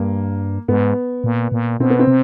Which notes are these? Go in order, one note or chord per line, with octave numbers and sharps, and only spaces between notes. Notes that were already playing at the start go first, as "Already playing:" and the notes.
Already playing: G2 A#3
G#2 B3
A#2
A#2
B2 C4
B3
C4
C3